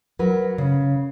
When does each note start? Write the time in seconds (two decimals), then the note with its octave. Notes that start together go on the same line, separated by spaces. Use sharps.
0.19 F#3 A#4 B4
0.58 C#3